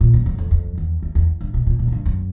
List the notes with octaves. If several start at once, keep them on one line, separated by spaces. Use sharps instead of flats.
A#2
F#2
F#2
F2
F2
E2
E2
E2
G2
B2
A#2
A#2
F#2
G2
F#2